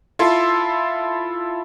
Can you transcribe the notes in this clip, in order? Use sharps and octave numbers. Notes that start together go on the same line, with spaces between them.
E4 F4 A4 C6